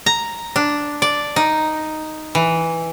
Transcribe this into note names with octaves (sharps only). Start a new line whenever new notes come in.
A#5
D4
D5
D#4
E3